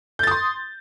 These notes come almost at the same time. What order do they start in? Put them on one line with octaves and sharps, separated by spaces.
G6 A6 D#6 C6